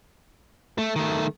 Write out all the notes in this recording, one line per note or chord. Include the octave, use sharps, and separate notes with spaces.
A3
D#3 A3